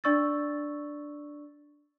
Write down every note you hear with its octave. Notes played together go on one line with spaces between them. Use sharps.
D4 D5 C#6 E6 A6